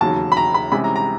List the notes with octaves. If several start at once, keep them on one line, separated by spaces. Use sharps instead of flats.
E1 D#2 C#3 F#3 A5
B5
A#5
B5
C2 C3 E3 G#3 C#4 B5
A#5
A#5